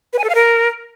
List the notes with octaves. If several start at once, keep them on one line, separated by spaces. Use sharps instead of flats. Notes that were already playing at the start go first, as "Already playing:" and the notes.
B4
G#5
A4
F5
A#4